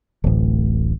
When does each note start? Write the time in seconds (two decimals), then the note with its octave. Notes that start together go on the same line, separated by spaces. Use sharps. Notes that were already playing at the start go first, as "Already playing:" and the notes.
0.24 D1 A1